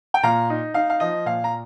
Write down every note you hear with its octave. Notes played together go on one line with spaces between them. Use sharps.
G5
A#2 F5 A#5
D#4
D#4 F5
F5
F3 D#5
A#2 F5
A#5